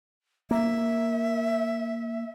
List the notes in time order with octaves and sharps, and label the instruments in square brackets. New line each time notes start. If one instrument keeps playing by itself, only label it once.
[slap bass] A#3 [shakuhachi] E5